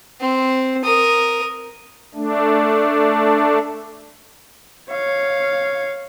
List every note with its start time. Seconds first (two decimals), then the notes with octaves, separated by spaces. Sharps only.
0.21 C4
0.85 A#4 D#6
2.15 A3 D4
4.90 C#5 F5